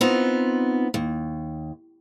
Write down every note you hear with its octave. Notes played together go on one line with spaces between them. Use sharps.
B3 C4 D#4 F4
D#2